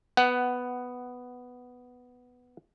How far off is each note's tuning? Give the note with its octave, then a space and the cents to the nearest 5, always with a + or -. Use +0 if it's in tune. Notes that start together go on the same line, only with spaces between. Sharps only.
B3 +5 F#5 +15